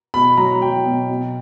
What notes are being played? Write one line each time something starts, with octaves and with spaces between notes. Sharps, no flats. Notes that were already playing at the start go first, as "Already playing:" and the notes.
B2 B5
F#3 A#5
F#3 G5
B2
B2